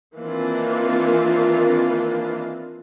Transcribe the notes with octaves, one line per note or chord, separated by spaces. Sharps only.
D#3 E3 A#3 C4 D4 F4